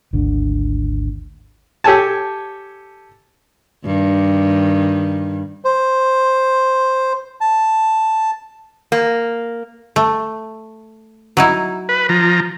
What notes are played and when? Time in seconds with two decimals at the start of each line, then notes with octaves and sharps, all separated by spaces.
0.13 G#1 D2 D3
1.84 G4 A4 C#5 G#5 A5
3.85 G2 D#3
5.65 C5
7.41 A5
8.92 A#3
9.96 A3
11.37 F#3 D#4 E4
11.89 B4
12.09 F3 A#5